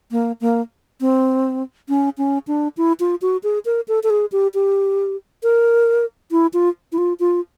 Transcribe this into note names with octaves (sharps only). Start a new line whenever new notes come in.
A#3
A#3
C4
C#4
C#4
D4
E4
F4
F#4
G#4
A#4
A4
A4
G#4
G4
G4
A#4
E4
F4
E4
F4
F4